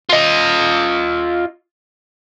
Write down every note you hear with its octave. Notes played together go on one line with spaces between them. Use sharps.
F4 D#5